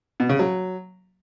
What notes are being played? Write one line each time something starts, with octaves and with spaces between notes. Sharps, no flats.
B2
C#3
F#3